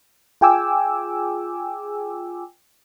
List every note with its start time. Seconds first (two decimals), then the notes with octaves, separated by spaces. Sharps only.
0.41 F4 G#4 G5 G#5 D6 E6